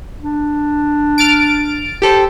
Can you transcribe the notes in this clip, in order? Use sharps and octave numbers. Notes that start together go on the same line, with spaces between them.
D4
F6 A6 D7
G4 A4 C5